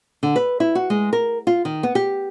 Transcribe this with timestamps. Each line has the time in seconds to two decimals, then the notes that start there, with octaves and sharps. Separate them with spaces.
0.23 D3
0.36 B4
0.60 E4
0.75 F#4
0.90 G#3
1.13 A#4
1.47 F4
1.65 D#3
1.83 B3
1.95 G4